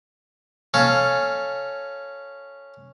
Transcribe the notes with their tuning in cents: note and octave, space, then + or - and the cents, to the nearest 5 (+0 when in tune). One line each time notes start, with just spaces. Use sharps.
C#4 +0 A4 +0 F5 +0